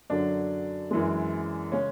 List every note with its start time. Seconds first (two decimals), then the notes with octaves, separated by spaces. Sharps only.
0.10 F#2 D3 F#3 D4
0.90 F#2 E3 G#3
1.72 C#3 G#3 C#4